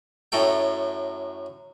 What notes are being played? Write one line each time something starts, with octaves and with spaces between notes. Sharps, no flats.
F#2 A2 F#3 A4 G5